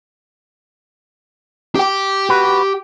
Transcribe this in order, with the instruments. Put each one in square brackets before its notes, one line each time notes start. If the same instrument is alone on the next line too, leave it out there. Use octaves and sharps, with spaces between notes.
[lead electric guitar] G4 G5
[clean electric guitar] F#4 B4